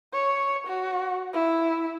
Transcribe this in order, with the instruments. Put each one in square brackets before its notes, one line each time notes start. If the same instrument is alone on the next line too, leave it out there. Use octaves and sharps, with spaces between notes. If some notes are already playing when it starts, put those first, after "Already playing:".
[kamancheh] C#5
F#4
E4